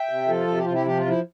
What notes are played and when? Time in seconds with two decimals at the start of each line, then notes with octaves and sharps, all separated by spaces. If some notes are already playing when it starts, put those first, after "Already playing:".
Already playing: E5 G5
0.09 C3
0.28 F3 F4 A4
0.47 C3
0.57 G4
0.65 C3 F4
0.73 E4 G4
0.86 F3 G4
0.98 F4
1.06 F3 E4